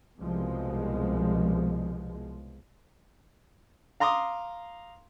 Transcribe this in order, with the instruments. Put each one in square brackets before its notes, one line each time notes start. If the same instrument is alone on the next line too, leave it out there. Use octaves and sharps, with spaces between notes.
[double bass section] C2 B2 F3 G#3
[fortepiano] F5 A#5 C6 D6 D#6